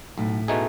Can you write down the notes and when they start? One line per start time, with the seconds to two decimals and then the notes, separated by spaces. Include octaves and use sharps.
0.18 B1 A2
0.48 B2 A3 D#4 G#4